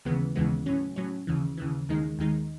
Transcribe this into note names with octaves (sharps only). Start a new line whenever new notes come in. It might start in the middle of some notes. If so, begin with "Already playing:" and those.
D#2 C#3 E3 G#3 B3
D#2 C#3 E3 G#3 B3
A2 F#3 C#4
A2 F#3 C#4
D#2 C#3 E3
D#2 C#3 E3
D#2 D#3 G#3 D#4
D#2 D#3 G#3 D#4